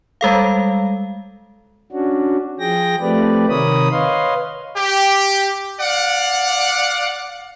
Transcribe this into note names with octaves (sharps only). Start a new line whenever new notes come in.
G3 G#3 A4 F5
C#4 D4 F#4
F3 G#4 G5 A#6
F3 A3 C4 G4 B4 D5
C3 D#3 A#4 C#5 B5 D#6
B4 C#5 D#5 F5 C6
G4
D5 F5 F#5